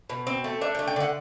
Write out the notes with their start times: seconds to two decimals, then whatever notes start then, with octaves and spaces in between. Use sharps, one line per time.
0.10 B2
0.27 C4
0.44 A3
0.61 D4 E5
0.75 G5
0.79 A3
0.87 G5
0.96 D3 F#5